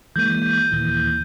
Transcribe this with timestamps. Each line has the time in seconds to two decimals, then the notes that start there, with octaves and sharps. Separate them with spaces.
0.16 E3 G#3 A#3 G6 D#7
0.71 D#2 A#2 E3